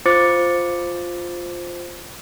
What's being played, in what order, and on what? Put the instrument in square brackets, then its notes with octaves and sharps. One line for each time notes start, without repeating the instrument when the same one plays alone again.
[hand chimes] F4 C5 D6 A6 C#7